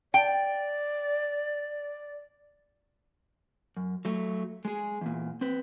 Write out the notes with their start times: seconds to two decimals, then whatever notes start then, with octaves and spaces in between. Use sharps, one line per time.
0.14 D5 G5
3.77 F#2
4.05 F#3 A3
4.65 G#3 G#4
5.01 E2 A#2
5.41 C4 B4